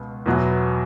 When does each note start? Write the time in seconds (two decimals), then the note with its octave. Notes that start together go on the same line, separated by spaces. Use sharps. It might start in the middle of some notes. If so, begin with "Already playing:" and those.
Already playing: C#2 B2
0.26 E2 B2 F#3 B3